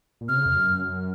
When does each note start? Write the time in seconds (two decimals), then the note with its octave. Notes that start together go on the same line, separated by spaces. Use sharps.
0.21 A#2
0.28 C3 F6
0.37 C#3
0.46 F2
0.55 F#2